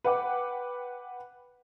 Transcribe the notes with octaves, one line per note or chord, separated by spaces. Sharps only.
B4 F#5 G5 D6